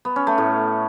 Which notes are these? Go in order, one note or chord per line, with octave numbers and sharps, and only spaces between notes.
B3
C#4
A3
A2